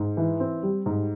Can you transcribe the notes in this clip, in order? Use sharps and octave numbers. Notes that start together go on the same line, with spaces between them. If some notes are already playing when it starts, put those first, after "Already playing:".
Already playing: G#2
E3
C4
G3
G#2